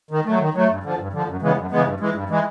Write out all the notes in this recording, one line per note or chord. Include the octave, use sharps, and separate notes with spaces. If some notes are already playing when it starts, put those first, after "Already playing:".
D#3
F#3 A3
D#3
F#3 A3
G2
D3 F3
G2
D3 F3
F#2
C#3 E3 G#3 B3
F#2
C#3 E3 G#3 B3
G2
E3 G#3
G2
E3 G#3